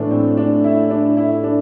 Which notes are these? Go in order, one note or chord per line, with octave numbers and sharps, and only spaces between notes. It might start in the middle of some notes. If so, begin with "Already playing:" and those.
Already playing: A2 E3 A3 D4
C4
D4
E4
D4
E4
D4